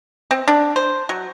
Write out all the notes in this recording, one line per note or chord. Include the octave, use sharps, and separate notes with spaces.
C4
D4
C5
F#3